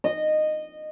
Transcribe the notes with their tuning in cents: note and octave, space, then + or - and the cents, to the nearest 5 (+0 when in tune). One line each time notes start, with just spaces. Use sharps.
D#5 -15